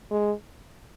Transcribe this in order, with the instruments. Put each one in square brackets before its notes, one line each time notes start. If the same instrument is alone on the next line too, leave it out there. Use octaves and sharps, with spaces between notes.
[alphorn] G#3